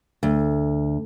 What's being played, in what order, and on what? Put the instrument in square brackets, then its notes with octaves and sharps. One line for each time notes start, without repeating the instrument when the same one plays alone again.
[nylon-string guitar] D2